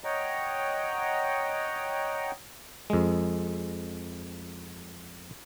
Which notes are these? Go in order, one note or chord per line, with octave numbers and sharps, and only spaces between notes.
C#5 D#5 F#5 G5 A#5
F2 G#3